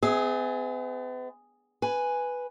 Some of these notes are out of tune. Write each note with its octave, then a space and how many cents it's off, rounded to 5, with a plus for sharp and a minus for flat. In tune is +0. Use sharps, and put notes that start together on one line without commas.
B3 +45 G#4 +0 E5 -40
B4 +0 G#5 +0